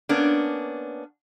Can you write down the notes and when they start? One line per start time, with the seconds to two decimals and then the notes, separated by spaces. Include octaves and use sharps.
0.09 A#3 B3 C#4 D4